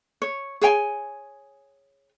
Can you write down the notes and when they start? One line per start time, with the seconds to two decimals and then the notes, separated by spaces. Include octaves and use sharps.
0.22 C#5
0.61 G#4 C#5 G5 G#5